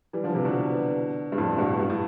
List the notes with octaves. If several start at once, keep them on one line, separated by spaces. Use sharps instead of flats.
E3 G3
D3 F3
C3 E3
B2 D3
G2
F2 A2
G2 B2
G2
A2